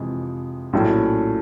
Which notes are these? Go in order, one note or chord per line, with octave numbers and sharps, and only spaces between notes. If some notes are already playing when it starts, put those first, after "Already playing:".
Already playing: F2 C3 E3 G#3
A#1 A2 F#3 A3 C#4